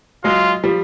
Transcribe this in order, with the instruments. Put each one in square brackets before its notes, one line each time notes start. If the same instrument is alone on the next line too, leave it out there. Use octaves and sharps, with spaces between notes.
[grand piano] F#3 G#3 [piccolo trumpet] F4
[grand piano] F3 G3